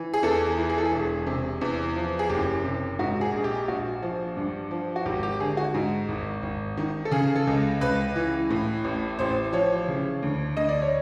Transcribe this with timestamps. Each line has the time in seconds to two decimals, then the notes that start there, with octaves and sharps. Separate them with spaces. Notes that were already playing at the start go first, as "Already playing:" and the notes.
Already playing: E3
0.14 G#4
0.23 E2 A4
0.47 G#4
0.58 E3
0.70 G#4
0.78 A4
0.85 G#4
0.92 E1
1.26 C3
1.61 E2
1.96 F3
2.19 G#4
2.29 F#1 G4
2.64 C3
2.99 G#2 F#4
3.21 G#4
3.33 A#1
3.44 G4
3.68 A#1 F#4
4.02 F3
4.37 G2
4.71 F3
4.96 F#4
5.05 G#1 G4
5.23 G4
5.40 D3 G#4
5.57 F#4
5.74 G#2
6.08 G#1
6.43 G#1
6.77 D#3
7.05 A4
7.11 C#3 G#4
7.35 A4
7.47 C#2
7.81 C#2 B4
8.15 E3
8.50 A2
8.84 A1
9.19 A1 C5
9.53 F3 C#5
9.88 C#3
10.22 D2
10.57 D2 D#5
10.69 D5
10.82 C#5